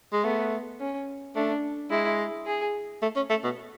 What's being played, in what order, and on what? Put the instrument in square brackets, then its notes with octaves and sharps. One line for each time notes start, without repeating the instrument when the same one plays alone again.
[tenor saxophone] G#3
[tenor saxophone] A3 [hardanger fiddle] B3
[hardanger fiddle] C#4
[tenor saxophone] A3 [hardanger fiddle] D4
[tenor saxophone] G#3 [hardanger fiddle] E4
[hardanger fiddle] G#4
[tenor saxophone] A3
C#4
A3
B2